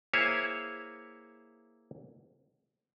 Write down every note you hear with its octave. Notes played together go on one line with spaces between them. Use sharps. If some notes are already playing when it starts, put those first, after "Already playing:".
A#3 E4 G#4 C5 C#5 E5